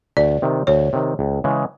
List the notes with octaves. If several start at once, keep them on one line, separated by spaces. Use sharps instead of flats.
D2 D5
C3 D#3
D2 C#5
C3 D#3
C#2
C#3 E3 G#3